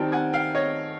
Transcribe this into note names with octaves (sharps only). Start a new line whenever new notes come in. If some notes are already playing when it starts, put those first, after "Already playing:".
Already playing: D#3 G3 C4 D#4 G5 A5
F#5 G#5
F5 G5
C#5 D#5